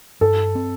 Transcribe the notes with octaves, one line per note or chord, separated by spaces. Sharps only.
G2 A4
C4